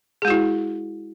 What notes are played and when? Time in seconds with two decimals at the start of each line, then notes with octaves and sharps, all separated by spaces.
0.22 G#4
0.25 G#3
0.28 F#4
0.30 E4